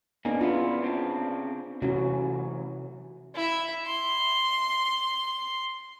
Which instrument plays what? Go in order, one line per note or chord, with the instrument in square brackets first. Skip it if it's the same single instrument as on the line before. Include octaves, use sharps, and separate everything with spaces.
[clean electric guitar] A#3 D#4 G#4 [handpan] B3 D4
[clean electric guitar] C#3 B3 E4 [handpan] F4
[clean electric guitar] C#3 C4 D4
[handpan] C3 C#4 F#4 [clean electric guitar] E3 F#3 A3
[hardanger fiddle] E4 E5
C6